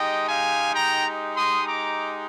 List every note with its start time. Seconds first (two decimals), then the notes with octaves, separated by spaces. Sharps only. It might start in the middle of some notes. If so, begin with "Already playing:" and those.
Already playing: G#3 D#4 G4 D#5 G5
0.27 F5 G#5
0.73 G5 A#5
1.35 C6 D#6
1.66 A#5 D6